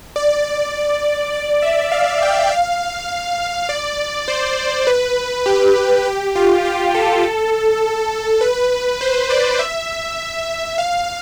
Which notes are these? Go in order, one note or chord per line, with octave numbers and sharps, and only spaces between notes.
D5
D5
E5
F5
G5
F5
D5
C5
B4
G4
G4
F4
G4
A4
B4
C5
D5
E5
F5